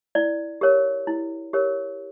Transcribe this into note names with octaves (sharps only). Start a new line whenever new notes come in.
E4 D5
G4 A#4 C#5
E4
G4 A#4 C#5